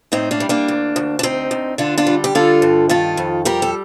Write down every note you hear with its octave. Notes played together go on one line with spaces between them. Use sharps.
A2 C4 D#4
A#3 D4
G3
A#3 D4
D2
D2
D4
D2 C4 D#4
D2
D3 D4 F4
D4 F4
G3
G4
D3 F4 A4
G2
D#3 F4 A4
F2
G3 G4 A#4
A4